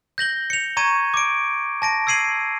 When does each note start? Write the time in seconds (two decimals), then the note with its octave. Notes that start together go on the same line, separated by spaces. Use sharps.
0.18 G6 A#6 F#7 G7
0.50 C#7 F7
0.77 A#5 C#6 G#6 D#7
1.14 D6 D7
1.82 A5 A#6 D7
2.07 E6 G#6 C7 D#7 F#7